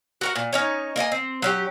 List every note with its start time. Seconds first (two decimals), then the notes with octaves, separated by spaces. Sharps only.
0.21 F#4 A#4 F#5
0.35 A#2
0.53 C#4 D#4 C#5
0.96 A#3 D#5 G5 G#5
1.12 C4
1.42 F#3 C#4 G4